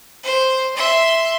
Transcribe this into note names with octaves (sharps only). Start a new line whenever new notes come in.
C5
E5 C6